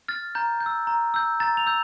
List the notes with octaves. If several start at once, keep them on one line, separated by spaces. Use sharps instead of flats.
F6 A6
A#5 G6
G6
E6
A#5
E6 G6
A#5 A6
F7
E6 G6